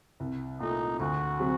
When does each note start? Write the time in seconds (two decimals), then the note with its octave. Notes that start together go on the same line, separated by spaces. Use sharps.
0.20 C2
0.60 A#2 A3 D#4
1.00 D2 F#4
1.40 C3 F#3